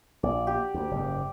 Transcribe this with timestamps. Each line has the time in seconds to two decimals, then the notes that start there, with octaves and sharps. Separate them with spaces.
0.23 A#1 D5
0.47 G4
0.74 D2
0.91 F#1 G#2